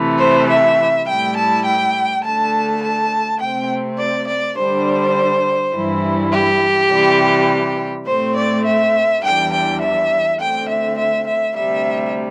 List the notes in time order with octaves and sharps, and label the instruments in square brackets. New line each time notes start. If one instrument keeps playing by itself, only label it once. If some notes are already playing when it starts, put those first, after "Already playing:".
Already playing: [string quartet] C3 E3 A3
C5
E5
A2 G3 E4 G5
A5
G5
D2 D3 A3 A5
A5
C3 A3 C4 G5
D5
D5
D3 G3 D4 C5
G2 E3 G3 E4
G4
C3 E3 G3
A2 A3 C4 C5
D5
E5
E2 E3 G3 D4 G5
G5
E5
D2 D3 C4 G5
E5
E5
E5
D2 C3 G3 E5